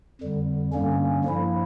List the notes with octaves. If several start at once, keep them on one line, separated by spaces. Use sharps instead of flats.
F2 D3 G3
G2 D3 G3 A#3 C#4
G2 F3 A#3 E4